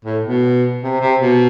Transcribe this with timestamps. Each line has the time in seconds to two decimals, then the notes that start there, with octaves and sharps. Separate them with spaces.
0.05 A2
0.24 B2
0.83 C3
1.01 C3
1.21 B2